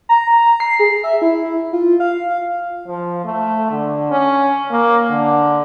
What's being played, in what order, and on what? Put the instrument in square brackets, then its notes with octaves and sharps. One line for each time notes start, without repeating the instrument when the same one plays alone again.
[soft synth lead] A#5
C7
G#4
E5
E4
F4
F5
[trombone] F3
A3
D3
C#4
A#3
D3